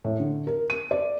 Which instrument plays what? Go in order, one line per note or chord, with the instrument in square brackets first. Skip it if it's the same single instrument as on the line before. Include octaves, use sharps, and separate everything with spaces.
[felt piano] A2
D3
A#4
D#7
D5